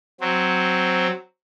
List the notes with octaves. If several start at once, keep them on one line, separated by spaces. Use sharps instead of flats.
F#3 C4